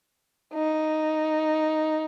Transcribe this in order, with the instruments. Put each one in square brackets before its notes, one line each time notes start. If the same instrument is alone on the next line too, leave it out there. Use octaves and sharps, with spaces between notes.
[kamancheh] D#4